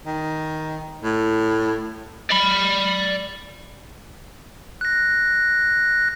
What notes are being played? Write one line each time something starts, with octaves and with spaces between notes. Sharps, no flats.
D#3
A2
D5 B5
F#6 A#6